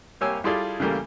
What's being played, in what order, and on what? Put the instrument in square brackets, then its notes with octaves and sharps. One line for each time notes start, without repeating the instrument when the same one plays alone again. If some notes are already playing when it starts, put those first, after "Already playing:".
[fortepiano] C2 A#3 G4 C#5 G#5 E6
G3 E4 F4 G#4 A4 D5
C#3 E3 G3 A3 A#3